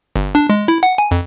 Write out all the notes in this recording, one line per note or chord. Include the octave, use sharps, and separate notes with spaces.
G1
D4
G#3
E4
F#5
G#5
F2